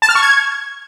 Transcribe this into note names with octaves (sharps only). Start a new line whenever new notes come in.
A5
F6
C#6
G#6